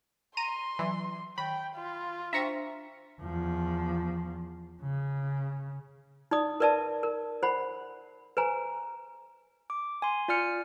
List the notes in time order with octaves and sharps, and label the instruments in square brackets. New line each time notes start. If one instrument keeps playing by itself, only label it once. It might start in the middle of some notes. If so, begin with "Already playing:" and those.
[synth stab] A#5 D#7 [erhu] C6
[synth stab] E3 [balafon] F#3
[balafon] D#3 C#6 [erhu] G5 [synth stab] B5
[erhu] F4
[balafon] D4 C5 G5 [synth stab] E5 A#5 C#6
[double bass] E2 F3
C#3
[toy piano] D#4 D5 D#6
A#4 B4 D5 E5 A5
A#4
C5 F#5 B5
B4 C5 G#5 A#5
[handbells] D6
G#5 C6
F4 D5 G#5 F6 C#7